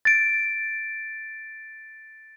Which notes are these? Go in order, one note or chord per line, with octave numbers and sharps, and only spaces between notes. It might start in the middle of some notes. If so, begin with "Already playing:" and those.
A6 D7